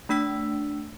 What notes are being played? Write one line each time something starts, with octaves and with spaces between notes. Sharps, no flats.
A3 D4 E6 B6